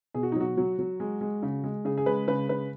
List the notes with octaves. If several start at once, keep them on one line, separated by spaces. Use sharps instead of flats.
B2 G#4
F#4
D#4
F#3 F#4
F#3
F#3
G#3
G#3
C#3
G#3
C#3 G#4
G#4
G#3 B4
C#3 B4
C#3 B4